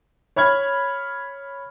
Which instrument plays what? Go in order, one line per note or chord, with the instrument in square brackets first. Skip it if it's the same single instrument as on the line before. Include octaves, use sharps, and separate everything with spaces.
[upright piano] C#5 B5 F6 G#6